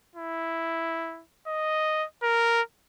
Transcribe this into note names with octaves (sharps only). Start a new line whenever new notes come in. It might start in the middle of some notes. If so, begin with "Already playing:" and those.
E4
D#5
A#4